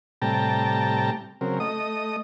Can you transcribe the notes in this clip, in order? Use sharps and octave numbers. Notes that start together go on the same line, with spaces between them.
A2 C3 G3 G5 A5 A#5
C#3 F#3 C4 A#4
A3 D#5 D#6